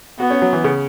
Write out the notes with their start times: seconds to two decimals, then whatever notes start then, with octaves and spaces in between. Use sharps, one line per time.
0.19 B3 F#4
0.30 C#4
0.42 F#3
0.53 E3
0.64 C#3